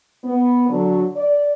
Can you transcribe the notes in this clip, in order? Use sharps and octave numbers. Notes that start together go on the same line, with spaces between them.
B3
D3 F#3
D5